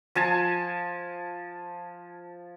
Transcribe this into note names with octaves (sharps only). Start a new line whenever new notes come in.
F3 G#5 A5